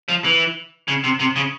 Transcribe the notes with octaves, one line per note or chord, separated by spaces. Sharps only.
F3
E3
C#3
C3
C3
C#3